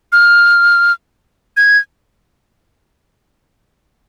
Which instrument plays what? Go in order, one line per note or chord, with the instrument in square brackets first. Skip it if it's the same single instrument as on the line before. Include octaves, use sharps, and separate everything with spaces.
[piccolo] F6
G#6